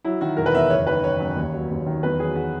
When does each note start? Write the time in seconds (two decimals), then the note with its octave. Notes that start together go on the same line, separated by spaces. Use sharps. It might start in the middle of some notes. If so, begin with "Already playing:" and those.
0.05 F#3 E4
0.21 D#3 F#4
0.37 E1 A#4
0.46 B4
0.54 E2 E5
0.70 F#1 C#5
0.87 D#3 B4
1.04 F#1 C#5
1.20 F#2
1.36 D#2
1.54 F#3
1.70 D#2
1.86 D#3
2.03 E2 B4
2.20 F#3 G#4
2.36 F#4